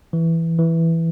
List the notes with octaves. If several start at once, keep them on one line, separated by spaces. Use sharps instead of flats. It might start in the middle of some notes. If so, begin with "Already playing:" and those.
E3
E3